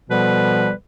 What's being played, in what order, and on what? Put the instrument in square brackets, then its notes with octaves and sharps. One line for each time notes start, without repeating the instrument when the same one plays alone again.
[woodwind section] B2 F3 G3 B3 A4 B4